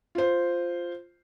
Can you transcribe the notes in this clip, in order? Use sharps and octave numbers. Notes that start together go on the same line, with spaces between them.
F4 C5